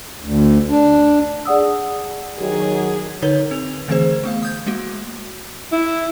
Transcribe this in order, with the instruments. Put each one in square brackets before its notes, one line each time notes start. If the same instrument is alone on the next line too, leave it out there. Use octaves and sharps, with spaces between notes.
[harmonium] D2
D4
[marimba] G#4 D5 F#5 D#6 E6
[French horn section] D#3 F#3 [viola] G#4
[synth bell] D3 D#4 B4 C#5 G7
C4 F7
D3 E3 A3 C4 G#4 C5
A3 B3 F5
D#6 G6 G#6
G#3 A#3 F#4
[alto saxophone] E4